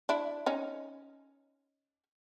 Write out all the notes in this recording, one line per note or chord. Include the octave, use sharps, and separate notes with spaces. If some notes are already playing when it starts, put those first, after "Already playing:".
D4 E4
C#4 D#4